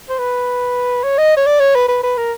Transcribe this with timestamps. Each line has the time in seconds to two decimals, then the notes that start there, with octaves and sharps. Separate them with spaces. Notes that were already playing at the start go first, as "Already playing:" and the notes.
0.09 C5
0.19 B4
1.04 C#5
1.18 D#5
1.37 C#5
1.46 D5
1.60 C#5
1.75 B4
1.88 B4
2.03 B4
2.17 A#4